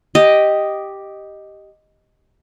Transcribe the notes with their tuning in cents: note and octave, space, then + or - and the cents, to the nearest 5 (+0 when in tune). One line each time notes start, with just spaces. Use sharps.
G4 +0 D#5 +0